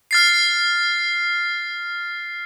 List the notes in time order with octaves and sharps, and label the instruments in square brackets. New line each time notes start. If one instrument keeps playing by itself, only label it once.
[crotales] F6 A6 C7